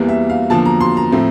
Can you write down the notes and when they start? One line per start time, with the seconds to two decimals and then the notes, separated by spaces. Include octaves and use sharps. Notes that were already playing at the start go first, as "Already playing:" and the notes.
Already playing: E2 E3 G3 A#3
0.09 E5
0.30 F5
0.50 E2 D3 F3 A#3 A5
0.65 A#5
0.81 C6
0.97 A#5
1.12 A2 F3 A3 C4